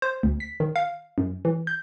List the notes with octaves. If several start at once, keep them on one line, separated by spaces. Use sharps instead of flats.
C5
D2
B6
D#3
F5
F#2
E3
G6